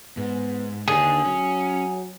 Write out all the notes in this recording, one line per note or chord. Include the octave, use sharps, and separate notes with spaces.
G#2 B3
D#2 D3 D4 G#4
F#3 C#4